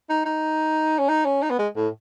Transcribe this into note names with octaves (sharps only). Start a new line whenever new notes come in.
D#4
D#4
C#4
D#4
C#4
D#4
B3
G#3
A2